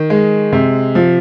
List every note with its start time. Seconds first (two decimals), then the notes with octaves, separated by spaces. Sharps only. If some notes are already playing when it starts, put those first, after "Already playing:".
Already playing: D#3
0.10 G#3
0.52 C3
0.95 F3